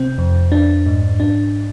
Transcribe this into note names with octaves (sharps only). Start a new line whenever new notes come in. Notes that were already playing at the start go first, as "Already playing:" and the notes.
Already playing: C3 C4
F2
D4
G#2
D4